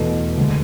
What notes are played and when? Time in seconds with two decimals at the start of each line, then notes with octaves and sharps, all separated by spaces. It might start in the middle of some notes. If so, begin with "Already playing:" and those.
Already playing: E2 B2 A3
0.37 D2 D3 G#3